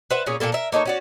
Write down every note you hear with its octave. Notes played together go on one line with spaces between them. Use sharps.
B4 C5 E5 F#5
A#2 C#4 G#4
A#2 E3 A#3 A4
A#4 E5
A#3 D#4 A4 C#5
C#4 F#4 D5